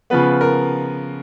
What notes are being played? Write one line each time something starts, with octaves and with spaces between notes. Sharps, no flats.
C#3 F3 B3 B4
A#4